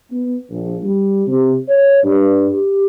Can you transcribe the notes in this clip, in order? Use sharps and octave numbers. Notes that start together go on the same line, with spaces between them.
B3
A#1
G3
C3
C#5
G2
G4